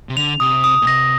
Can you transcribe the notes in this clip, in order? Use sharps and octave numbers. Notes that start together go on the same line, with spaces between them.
C3
D3 F7
C3 D#6
D#6
A#2
C3 A#6